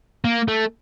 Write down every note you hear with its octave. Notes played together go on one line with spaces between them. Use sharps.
A#3
A3